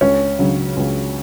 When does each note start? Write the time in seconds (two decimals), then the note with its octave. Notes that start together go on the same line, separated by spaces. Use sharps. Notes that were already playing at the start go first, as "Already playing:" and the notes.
0.01 C#2 C#4
0.39 C#3 F#3
0.77 C#2